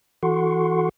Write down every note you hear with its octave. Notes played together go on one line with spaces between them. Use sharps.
E3 F#4 A4 F#5 C6 C#6